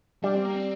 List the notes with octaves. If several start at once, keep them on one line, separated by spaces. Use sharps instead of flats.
G3 D4
C4
A#3
C4